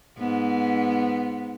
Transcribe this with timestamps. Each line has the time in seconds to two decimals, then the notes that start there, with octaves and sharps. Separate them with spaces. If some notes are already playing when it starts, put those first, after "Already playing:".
0.18 G#2 B3